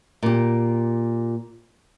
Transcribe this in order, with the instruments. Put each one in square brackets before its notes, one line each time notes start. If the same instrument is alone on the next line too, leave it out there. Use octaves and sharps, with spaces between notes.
[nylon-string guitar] A#2 G4